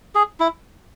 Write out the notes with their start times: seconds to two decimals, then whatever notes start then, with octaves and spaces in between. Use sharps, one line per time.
0.15 G#4
0.40 E4